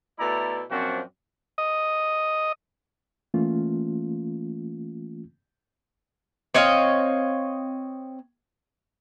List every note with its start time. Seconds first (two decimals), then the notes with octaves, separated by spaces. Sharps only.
0.19 B2 A3 E4 A4 D5 A#5
0.70 F#2 A#2 F3 C4 D4 F#4
1.58 D#5
3.34 E3 A3 A#3 C#4 F4
6.54 C4 C#5 D#5 F5